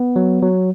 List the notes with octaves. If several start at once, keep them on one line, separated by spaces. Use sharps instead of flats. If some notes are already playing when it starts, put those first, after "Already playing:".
Already playing: B3
F#3
F#3